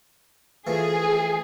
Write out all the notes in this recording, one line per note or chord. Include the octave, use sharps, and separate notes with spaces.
E3 F3 A3 G#4